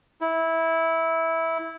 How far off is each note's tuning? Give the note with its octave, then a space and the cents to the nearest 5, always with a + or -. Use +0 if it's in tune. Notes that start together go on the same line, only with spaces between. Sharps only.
E4 -15